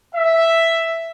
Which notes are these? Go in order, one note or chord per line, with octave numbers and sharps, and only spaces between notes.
E5